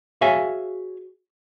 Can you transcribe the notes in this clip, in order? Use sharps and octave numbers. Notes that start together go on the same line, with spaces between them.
F#4 G#4 C#5 E5 F5 G#5